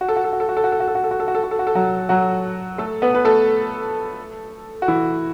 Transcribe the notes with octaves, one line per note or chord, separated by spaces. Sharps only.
F#4
A4
F#4
A4
F#4
A4
F#4
A4
F#4
A4
F#4
A4
F#4
A4
F#4
A4
F#4
A4
F#4
A4
F#4
A4
F#3 F#4
F#3 F#4
A3 A4
B3 B4
B4
A3 A4
F#4
E3 E4